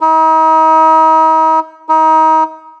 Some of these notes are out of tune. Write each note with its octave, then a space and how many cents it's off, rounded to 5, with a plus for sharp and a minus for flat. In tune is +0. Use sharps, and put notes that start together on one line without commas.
D#4 +40
D#4 +30